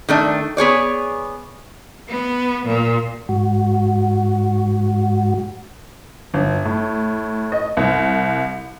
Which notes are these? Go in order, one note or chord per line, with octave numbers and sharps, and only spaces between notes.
D#3 A3 D4
B3 G#4 C#5 D5
B3
A#2
G#2 F#4
G1
A2
D#5
C2